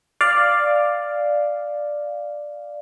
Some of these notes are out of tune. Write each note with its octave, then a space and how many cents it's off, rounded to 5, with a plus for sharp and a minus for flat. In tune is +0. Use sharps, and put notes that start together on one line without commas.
D5 +5 F5 +0